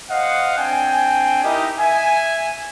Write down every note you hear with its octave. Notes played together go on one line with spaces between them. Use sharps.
C5 D#5 F5 F#5
C4 D4 G5 G#5
D#4 E4 G4 A#4 D#5
E5 G#5